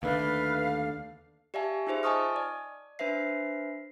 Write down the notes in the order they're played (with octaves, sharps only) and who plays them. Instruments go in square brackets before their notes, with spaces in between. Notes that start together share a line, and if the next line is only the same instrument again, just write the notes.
[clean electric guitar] D#2 D3 A3 [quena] B4 [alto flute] F5
[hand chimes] G4 D5 E5 F5 G#5 A5
D#4 F4 G#4 C5 E5
D#5 G#5 A5 C#6 D#6 F6
D5
D4 B4 C5 E5 C7